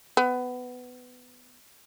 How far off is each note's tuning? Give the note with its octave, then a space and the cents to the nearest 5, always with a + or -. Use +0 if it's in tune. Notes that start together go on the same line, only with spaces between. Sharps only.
B3 +15